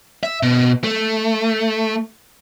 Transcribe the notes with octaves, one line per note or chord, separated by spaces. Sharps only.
E5
B2
A3